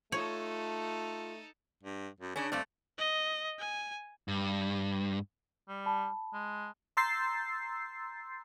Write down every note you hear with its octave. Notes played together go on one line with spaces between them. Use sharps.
A3 D#4 F4 A4 C#5
G2
F#2
C#3 C#4 D4
G2 A3 C4 D5
D#5
G#5
G2
G3
A5 B5
G#3
A#5 C6 E6 G6 A6 C7